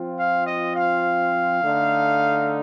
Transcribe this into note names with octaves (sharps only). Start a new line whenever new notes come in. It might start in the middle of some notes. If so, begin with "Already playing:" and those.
Already playing: F3 C4 F4
F5
D#5
F5
D3 A3 D#4